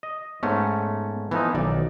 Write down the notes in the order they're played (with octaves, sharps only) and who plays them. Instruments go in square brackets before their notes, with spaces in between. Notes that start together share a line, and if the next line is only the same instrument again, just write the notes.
[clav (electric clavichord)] D#5
[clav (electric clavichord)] G#2 A3 C#4 [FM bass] B3
[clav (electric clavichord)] E3 F3 D#4 [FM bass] B3
[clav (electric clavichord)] B1 D5 [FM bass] D#3